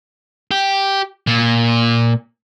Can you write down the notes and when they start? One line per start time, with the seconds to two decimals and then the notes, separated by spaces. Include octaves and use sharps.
0.51 G4
1.27 A#2